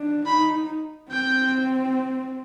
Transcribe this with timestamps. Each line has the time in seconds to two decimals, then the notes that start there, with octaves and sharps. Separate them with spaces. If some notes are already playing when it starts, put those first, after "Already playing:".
Already playing: D4
0.26 D#4 B5
1.11 C4 G5